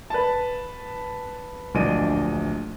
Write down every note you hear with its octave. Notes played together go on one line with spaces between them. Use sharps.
B4 A5
D1 A#1 D4 D#5 D#7